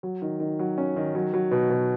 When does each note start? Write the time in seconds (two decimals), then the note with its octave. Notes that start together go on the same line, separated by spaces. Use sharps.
0.03 F#3
0.22 D#3
0.40 D#3
0.59 F#3
0.78 C#4
0.96 D#3
1.15 F#3
1.34 F#3
1.51 B2
1.70 B2